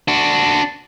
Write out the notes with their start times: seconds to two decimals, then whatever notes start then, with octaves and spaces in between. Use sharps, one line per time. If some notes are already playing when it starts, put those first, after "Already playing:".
0.08 D4 F#4